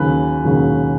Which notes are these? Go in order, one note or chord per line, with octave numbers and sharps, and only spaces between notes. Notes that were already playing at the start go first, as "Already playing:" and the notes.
Already playing: D#2 C#3 F#3 B4
D#2 C#3 F#3